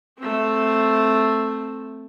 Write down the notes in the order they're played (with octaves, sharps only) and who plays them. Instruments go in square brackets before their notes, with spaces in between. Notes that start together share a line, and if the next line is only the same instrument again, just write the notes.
[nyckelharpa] A3 C4